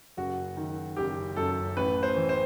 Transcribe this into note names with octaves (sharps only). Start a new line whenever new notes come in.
F#1 F#4
D#3
F#1 G4
F#2 A4
A1 B4
C5
E3
C5